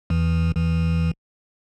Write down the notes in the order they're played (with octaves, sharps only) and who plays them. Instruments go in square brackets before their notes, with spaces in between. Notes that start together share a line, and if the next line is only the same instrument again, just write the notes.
[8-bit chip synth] E2 E3
E2 E3